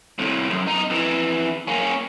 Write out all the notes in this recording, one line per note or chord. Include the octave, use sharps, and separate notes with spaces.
C2 A2
F#2
B1 D#4
F2 E3
A#3 C#4